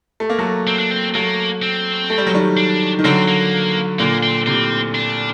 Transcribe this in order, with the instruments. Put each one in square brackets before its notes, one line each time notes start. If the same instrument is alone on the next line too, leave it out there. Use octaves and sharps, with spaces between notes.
[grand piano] A3
A#3
F#3 A3
[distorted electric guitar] C4
D4
C4
[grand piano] F#3 A3 [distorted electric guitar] A#3
[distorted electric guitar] C4
[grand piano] A3
G3
F#3
D#3 G3
[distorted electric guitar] D4
[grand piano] D#3
[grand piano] D3 F#3 [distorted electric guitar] C4
[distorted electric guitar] A#3
[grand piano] A#2 D3 [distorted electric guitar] A#3
[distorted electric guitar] C4
[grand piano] A2 C3 [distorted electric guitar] C4
[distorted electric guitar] D4